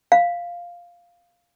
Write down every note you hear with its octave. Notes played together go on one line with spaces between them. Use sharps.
F5